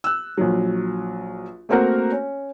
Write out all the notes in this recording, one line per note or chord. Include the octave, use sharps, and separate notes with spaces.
E6 F#6
A#1 F#3
A3 A#3 C4 F#4 A#4 F#5
C#4